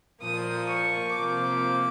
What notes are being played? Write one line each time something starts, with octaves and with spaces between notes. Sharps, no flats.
A#2 F3 A#3 D#6
C#6
C3 F3 A#3 D6